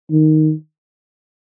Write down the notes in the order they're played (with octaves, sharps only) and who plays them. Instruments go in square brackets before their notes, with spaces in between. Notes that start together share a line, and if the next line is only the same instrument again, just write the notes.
[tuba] D#3